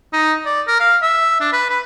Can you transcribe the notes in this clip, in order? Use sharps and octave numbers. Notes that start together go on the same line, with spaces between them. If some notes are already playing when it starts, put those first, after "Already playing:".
D#4
D5
A#4
F5
E5
D4
B4
B4